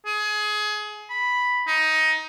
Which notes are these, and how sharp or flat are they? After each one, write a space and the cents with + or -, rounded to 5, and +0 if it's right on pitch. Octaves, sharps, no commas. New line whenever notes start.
G#4 +25
B5 +0
D#4 +15